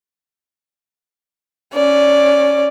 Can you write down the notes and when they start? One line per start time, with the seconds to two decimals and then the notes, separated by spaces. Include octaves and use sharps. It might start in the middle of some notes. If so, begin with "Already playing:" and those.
1.74 C#4 D5